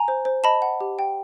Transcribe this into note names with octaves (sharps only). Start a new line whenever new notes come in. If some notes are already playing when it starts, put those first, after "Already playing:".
Already playing: G#5 A#5
C5
C5
D#5 A5 B5
F#5
G4
G5